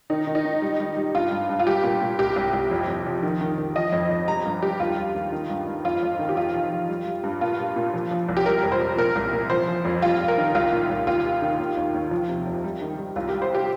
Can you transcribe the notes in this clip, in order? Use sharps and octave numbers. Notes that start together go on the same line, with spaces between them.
D#3 D#4
D#3
D#4
D#3
G3
G3
G3
G2 F4
G2
G2
F4
G3 G4
A#2
A#2
C2 G4
C2
C2
F2
F2
F3
D#3
D#3
D#3
F3 D#5
F2
F2
G3 A#5
G2
G3 G4
D#2 F4
G3
D#2
D#3
G2
G2
F2 F4
F2
D#3
G4
F2 F4
F3
F3
G3
G3
G2
A#2 F4
G3
A#2
F3
F3
C2
G4
G3 A#4
F2
C5
F2
A#2 A#4
C2
A#2
F3 C5
F3
F2
G3 F4
F2
A#4
D#3
C2 F4
A#2
C2
D#2 F4
G3
D#3
D#2
D#2
D#2
F3
C3
F2
G3
D#3
G3
C2 F4
G4
G3
C5
G3 G4